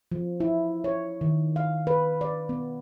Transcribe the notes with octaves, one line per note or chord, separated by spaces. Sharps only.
F3
E4
C#5
D#3
F5
B4
D5
B3